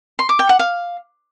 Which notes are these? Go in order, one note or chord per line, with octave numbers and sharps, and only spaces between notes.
C6
D6
G5
F#5
F5